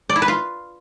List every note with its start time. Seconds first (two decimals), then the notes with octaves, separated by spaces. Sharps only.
0.10 D5
0.16 E4
0.22 B4
0.28 F4